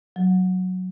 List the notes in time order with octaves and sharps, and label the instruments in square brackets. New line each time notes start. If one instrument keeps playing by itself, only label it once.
[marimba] F#3